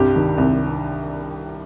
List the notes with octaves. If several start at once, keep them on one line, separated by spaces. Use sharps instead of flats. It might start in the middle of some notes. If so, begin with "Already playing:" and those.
Already playing: C2 G2 G4
D#3
C2